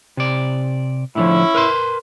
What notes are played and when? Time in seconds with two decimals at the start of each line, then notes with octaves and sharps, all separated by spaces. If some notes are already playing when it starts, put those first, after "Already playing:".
0.17 C3 D5
1.15 A2 D3 F3 C#4 E4
1.55 A#4 B4 C6